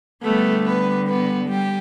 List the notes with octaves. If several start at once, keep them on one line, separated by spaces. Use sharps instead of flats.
D3 G3 A3 B3 A4
B3 B4
B3 B4
G3 G4